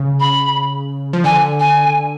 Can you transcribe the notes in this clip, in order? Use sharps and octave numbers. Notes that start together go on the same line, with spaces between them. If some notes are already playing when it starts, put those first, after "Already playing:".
Already playing: C#3
B5
F3
D3 G#5
G#5